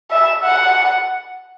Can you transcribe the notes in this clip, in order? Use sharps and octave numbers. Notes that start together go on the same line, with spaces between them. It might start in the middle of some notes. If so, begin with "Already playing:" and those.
E5
F#5